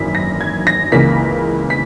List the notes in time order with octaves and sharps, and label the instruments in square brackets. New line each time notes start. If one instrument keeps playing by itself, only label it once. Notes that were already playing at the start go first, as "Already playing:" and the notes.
Already playing: [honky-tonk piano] G#1 F#2 E3 A#3 B6
A#6
G#6
A#6
C#2 C#3 E3 A#3 B6
B6